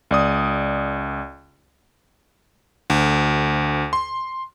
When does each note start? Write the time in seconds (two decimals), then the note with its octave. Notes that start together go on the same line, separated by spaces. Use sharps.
0.11 C#2 D5 D#6
2.90 D2
3.93 C6